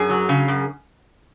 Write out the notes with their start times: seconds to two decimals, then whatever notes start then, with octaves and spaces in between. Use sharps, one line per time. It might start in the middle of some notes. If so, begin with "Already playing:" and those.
Already playing: F#2 G#4
0.09 F#3
0.29 C#3
0.48 F#2